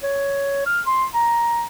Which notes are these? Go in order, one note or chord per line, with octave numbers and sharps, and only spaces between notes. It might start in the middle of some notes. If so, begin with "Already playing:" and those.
C#5
F6
C6
A#5